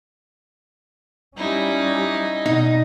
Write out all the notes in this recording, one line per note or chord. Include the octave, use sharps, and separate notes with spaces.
G3 C#4 D#4 E4
B2 D#4